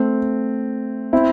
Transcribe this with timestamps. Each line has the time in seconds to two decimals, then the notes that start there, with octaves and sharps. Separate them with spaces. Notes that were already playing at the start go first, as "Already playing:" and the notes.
Already playing: A3 C4
1.13 C4 E4